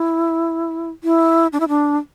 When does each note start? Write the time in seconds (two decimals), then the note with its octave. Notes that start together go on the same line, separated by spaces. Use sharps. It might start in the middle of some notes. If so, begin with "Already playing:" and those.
Already playing: E4
1.04 E4
1.53 D4
1.60 E4
1.68 D4